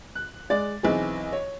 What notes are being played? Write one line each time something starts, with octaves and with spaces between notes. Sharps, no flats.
F#6
G#3 D5 A6
B1 E3 C4 G#4
C#5